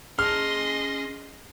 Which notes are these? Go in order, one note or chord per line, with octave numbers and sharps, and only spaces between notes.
C#4 G#4 D#5 A5 C6 F6